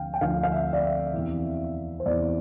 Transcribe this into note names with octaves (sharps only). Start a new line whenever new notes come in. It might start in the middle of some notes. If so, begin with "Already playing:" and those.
Already playing: D2 D3 F3 F5 G5
G5
D2 D3 F3 F5
F5
E5
D5
E5
E2 C3 E3
C5
E2 C3 E3 D5